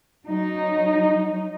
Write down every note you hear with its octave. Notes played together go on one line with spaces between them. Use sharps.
F#3 D#4